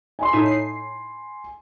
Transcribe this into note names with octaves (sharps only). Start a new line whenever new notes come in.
G#5 B5 C6
A2 D#4 E5
C7